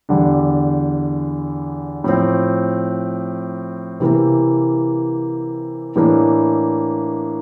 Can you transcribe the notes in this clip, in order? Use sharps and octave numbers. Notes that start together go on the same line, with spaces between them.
E2 D3 G3 D4
A2 F3 C4
C3 E3 A#3
A2 E3 A#3 D4